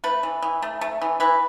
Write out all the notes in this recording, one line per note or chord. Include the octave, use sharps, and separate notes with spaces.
A3 B4
E3
E3
A3
A3
E3
E3 B4